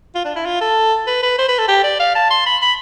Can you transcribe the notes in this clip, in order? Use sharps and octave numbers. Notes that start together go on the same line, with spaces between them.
F4
D4
E4
F4
A4
B4
B4
C5
B4
A4
G4
D5
F5
A5
C6
B5
B5